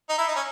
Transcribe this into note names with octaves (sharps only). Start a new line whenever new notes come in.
D#4
E4
D#4
C#4